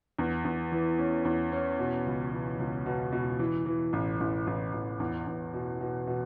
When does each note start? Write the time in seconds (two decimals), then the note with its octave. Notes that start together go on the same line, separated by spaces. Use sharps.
0.19 E2
0.45 E2
0.72 E3
0.98 C#4
1.25 E2
1.52 C#4
1.79 B2
2.06 C#2
2.33 B2
2.59 C#2
2.86 B2
3.12 B2
3.39 E3
3.66 E3
3.93 A1
4.20 A1
4.47 A1
4.73 A1
5.00 E2
5.27 E2
5.54 B2
5.80 B2
6.07 B2